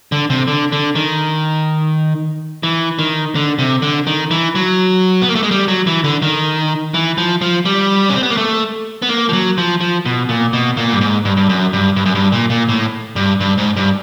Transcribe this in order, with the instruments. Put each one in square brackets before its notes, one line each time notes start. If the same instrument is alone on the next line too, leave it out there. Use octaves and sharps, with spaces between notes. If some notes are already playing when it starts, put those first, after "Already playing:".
[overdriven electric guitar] D3
C3
D3
D3
D#3
E3
D#3
D3
C3
D3
D#3
E3
F#3
B3
A#3
A3
G#3
G3
F#3
E3
D3
D#3
E3
F3
F3
G3
C#4
C4
B3
A#3
A3
B3
A#3
F3
F#3
F3
F3
B2
A#2
B2
A#2
G2
G#2
G2
G2
F#2
G2
G2
F#2
G2
A#2
A#2
A2
G2
G2
G#2
G2